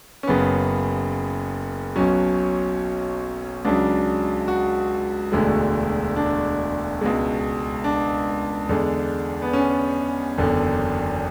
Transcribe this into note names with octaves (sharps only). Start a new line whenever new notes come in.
C#4
F#1 F#2 C#3 B3
B1 B2 F#3 C#4
C#2 C#3 F#3 D4
F#4
E1 D2 D3 G#3
D4
C#2 B2 G#3
D4
E2 D3 G#3
B3
C#4
F#1 E2 D3